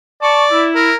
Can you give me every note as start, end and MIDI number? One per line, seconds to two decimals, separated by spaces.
0.22 0.69 74
0.22 0.44 81
0.22 0.44 85
0.51 0.91 64
0.75 0.96 70